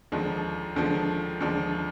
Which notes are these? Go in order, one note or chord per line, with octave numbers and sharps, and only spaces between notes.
D#2 D3 F3 G#3 D4
D#2 D3 F3 G#3 D4
D#2 D3 F3 G#3 D4